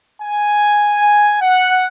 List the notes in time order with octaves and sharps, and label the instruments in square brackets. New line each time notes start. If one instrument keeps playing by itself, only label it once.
[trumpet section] G#5
F#5